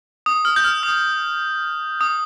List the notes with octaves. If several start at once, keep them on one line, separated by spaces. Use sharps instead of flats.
D#6
F6
G6
F6
D#6
D#6